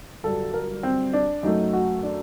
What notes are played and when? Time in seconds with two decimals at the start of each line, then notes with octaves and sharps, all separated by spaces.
0.23 G1 G2 F#3 A4
0.54 A#4
0.83 C4
1.13 D4
1.43 F#2 F#3 A3 D#4
1.73 F#4
2.03 D4